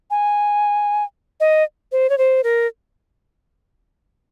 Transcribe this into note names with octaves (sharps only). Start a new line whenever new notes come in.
G#5
D#5
C5
C#5
C5
A#4